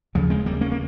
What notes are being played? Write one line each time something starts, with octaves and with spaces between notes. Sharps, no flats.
D#2 C#3 F3
G#3 C4
G3 A#3
A#3 C#4
A#3